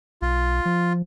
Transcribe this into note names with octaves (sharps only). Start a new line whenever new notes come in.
B1 F4
F3